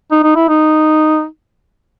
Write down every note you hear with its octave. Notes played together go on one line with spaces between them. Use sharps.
D#4
D#4
E4
D#4